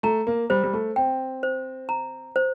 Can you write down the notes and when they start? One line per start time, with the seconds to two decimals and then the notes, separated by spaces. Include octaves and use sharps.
0.03 A3 A#5
0.27 A#3
0.50 G3 C5
0.64 G3
0.73 A3
0.96 C4 G5
1.43 C5
1.89 A#5
2.36 C5